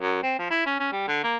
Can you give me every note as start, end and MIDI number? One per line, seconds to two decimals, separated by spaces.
0.01 0.20 42
0.23 0.36 60
0.39 0.48 53
0.50 0.64 64
0.66 0.78 61
0.80 0.91 61
0.92 1.05 55
1.08 1.22 50
1.23 1.37 58